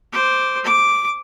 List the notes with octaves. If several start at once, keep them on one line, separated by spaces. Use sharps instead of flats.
C5 D6
D6